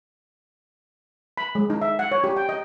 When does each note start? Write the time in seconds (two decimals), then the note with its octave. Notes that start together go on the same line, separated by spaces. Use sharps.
1.38 B5
1.55 G#3
1.70 D#4
1.82 E5
1.99 F#5
2.12 C#5
2.24 G4
2.37 G5
2.49 D#5